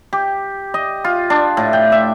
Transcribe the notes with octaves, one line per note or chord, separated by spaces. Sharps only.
G4
D#5
F4
D4
A2
G5
E5